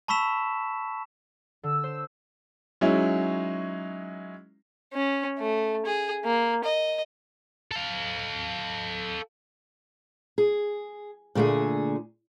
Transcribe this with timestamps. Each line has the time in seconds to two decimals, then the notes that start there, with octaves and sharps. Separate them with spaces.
0.08 A5 B5 C#6 E6 B6 E7
1.63 D3 E6
1.84 C5
2.81 F#3 G#3 C#4 D#4 E4
4.93 C#4
5.39 A3
5.86 G#4
6.25 A#3
6.64 D#5
7.71 A4 F5
10.38 G#4
11.35 A#2 D3 A3 D4 G#4